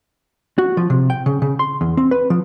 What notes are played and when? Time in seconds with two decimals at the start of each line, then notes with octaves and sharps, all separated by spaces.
0.58 F#4
0.77 F3
0.90 C3
1.10 G5
1.26 C#3
1.42 C#3
1.59 C6
1.81 E2
1.97 C4
2.11 B4
2.30 F3